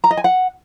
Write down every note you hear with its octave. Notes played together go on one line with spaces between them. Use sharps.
A#5
D#5
G#5
F#5